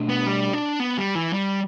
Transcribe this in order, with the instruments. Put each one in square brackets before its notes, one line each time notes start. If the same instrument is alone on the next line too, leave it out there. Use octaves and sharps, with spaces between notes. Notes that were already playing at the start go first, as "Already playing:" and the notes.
Already playing: [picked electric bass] B2 A3 D4
[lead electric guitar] B3
G3
D4
B3
G3
E3
G3